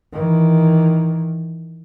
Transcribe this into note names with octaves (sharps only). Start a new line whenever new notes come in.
D#3 E3